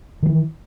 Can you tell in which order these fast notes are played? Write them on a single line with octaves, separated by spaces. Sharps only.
D#3 G3 E3